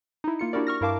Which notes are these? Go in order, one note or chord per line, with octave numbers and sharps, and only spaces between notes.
D#4 E4
A#3 F4 C#7
D4 E4 F#4 G4 A#4 D5
C#6 F6 A#6
G2 E4 A#4 F5 A5 D6